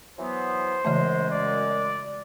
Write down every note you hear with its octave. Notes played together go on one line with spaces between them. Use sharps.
E3 F#3 B3 C5
F#2 C#3 E3 G#3 A3
D5